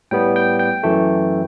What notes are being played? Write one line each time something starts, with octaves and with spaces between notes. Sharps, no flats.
A2 G3 B3 G5
G5
G5
F#2 E3 A3